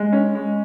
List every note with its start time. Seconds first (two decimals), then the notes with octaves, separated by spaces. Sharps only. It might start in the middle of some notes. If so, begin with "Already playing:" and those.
Already playing: G#3
0.12 C#4
0.35 G#3